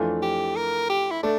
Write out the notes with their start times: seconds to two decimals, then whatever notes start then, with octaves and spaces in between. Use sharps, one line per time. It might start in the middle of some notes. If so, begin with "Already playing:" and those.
Already playing: F2 E3 A3 D4 F4
0.22 G4
0.56 A#4
0.89 G4
1.11 E4
1.23 A3 D4